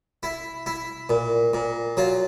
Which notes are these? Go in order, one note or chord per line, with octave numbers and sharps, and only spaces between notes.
E4
E4
A#2
A#2
F#3 F4